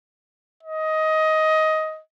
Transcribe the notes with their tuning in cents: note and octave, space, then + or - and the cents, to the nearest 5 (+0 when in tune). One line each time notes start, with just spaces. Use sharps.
D#5 +15